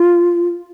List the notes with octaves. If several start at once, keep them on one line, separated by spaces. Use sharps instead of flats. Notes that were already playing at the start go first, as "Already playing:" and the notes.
Already playing: F4